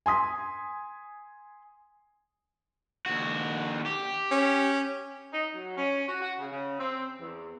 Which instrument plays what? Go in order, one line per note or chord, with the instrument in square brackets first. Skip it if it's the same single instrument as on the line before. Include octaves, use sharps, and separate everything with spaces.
[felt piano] G#5 C6 D#6 B6
[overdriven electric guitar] D#2 F#4
G4
[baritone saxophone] C#4
[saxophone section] D#4
F#3
C#4
F#4
F#4
C#3
C#3
C4
E2